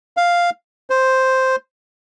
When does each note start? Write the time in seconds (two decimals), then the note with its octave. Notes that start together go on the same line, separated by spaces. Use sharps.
0.17 F5
0.90 C5